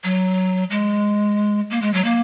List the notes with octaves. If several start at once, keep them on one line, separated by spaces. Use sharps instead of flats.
F#3
G#3
A#3
G#3
F#3
A#3